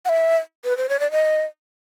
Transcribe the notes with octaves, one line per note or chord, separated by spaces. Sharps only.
F#5
E5
B4
C5
C#5
D5
D#5